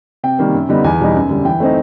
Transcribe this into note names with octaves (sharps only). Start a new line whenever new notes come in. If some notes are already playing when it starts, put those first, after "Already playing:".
C3 G5
D#3 G3 A#3
F#2
D3 G3 B3 D#4
E2 G#5
B2 G3 B3 D#4
F#2
D3 G3
E3 G5
A3 C4 D#4